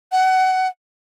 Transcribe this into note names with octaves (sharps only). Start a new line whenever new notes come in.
F#5